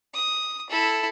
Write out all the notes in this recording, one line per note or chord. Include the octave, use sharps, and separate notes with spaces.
D#6
E4 A4